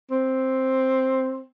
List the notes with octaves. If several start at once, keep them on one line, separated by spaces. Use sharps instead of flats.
C4